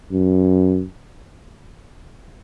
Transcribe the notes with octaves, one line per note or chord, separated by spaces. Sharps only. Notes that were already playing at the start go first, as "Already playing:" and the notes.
F#2